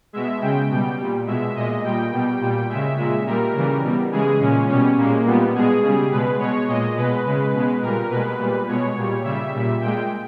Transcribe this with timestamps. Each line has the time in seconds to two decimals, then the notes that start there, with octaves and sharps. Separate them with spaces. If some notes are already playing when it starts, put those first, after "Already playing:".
0.13 B2 G#3 E5
0.41 C#3 G#3 G5
0.70 B2 G3
0.98 A#2 G3
1.26 B2 G#3 E5
1.55 A#2 G#3 D#5
1.84 A#2 G3 G5
2.12 B2 G3
2.41 A#2 G3
2.69 C#3 G#3 E5
2.97 A#2 G#3
3.26 A#2 G3 A#4
3.54 C#3 E3 G3
3.83 B2 G3
4.12 C#3 E3 G#3 G#4
4.39 A#2 G#3 C#4
4.68 B2 G3 C#4
4.97 A#2 G#3 A#3
5.26 A#2 G3 B3
5.55 B2 G#3 G#4
5.82 C#3 G3
6.11 B2 G#3 B4
6.39 B2 G#3 C#5
6.68 A#2 G#3 D#5
6.96 B2 G#3 B4
7.26 C#3 G#3
7.53 B2 G#3
7.82 A#2 G3 A#4
8.10 B2 G#3 B4
8.39 A#2 G3
8.68 B2 G#3 C#5
8.96 A#2 G3
9.24 C#3 G3 E5
9.53 A#2 G3
9.81 A#2 G#3 G5